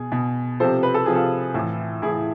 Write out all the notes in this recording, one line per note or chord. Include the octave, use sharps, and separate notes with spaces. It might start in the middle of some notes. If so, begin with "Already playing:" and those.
Already playing: B2 G#4
B2
C3 F3 A4 C5
B4
A4
C3 F3 G#4
F4 A4
A2 E3
A2 E3 E4 G#4